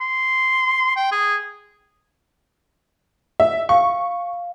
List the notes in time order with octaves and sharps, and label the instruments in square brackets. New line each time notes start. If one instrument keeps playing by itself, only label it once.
[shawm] C6
G5
G#4
[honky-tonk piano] E5
[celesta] F5 [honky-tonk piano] C#6